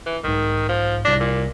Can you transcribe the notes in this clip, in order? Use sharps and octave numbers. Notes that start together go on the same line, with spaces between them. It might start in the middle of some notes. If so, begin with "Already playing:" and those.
E3
B1 G#2 D#3
F3
C2 D4 A#6
A#2